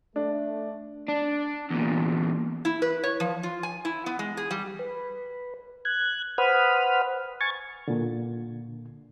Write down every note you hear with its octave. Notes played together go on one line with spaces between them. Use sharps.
A3 D4
D4
E2 A#2
E4
B4
C#5
F3
F4
G#5
E4
B3
G#3
G#4
G3
B4
F#6 G#6
B4 C5 F#5 B5 D#6 F6
G#5 C#6 G#6 A6
A#2 D3